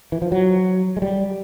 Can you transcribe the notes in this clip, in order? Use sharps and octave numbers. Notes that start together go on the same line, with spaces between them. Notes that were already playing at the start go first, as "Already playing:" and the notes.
E3
F3
F#3
G#3
G3